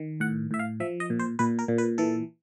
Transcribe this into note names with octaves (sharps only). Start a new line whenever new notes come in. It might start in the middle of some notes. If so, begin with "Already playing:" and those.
Already playing: D#3
A2 F#5
A2 E5
F5
F3 E5
D#5
A#2
C5
A#2 B4
A#4
A#2
B4
E3 A4